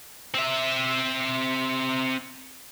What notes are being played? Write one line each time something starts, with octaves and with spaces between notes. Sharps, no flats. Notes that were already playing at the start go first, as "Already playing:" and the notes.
C4 E5